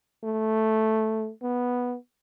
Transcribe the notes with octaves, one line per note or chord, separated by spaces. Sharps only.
A3
B3